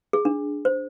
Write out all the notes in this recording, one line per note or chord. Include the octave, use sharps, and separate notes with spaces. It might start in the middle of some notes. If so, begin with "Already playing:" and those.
G#4
D4
C5